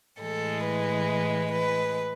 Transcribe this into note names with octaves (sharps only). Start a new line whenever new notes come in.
A2 E3 G#3 A4
B4
B4